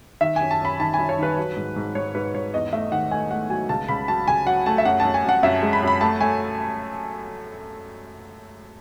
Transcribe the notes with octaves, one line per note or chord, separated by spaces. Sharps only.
D#3 E5
F#2 G#5
A5
F#2 B5
D#3 A5
F#2 G#5
C#5
D#3 B4
F#3
G#2
G#2
G#2 C#5
G#2 B4
G#2 C#5
E2 D#5
A3 E5
D#3 F#5
A3 G#5
A3 F#5
F#3 G#5
C#2 A5
C#2 B5
F#3 A5
C#2 G#5
F#3 F#5
A3 A5
E5
F#2 F#5
A5
F#2
G#5
F#2 F#5
F#2 E5
G#3
B5
F#2
B5
A3 A5
A3 G#5